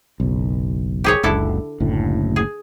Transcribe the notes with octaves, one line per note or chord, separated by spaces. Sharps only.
F#1 B1
G4 G#4 C#5
F#1 C#2 D3 E4 A4
F#1 D2 A2
G#4